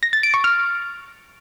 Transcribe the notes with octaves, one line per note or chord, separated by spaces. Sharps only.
A#6
A6
D7
C#6
F6